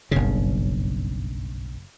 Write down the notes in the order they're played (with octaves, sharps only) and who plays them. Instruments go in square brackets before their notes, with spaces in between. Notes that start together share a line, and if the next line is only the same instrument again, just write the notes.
[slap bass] F#1 C#3 [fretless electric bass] B1 G2 C#4